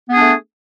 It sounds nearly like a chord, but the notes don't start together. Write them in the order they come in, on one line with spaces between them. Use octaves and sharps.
B3 G#4 D4 A3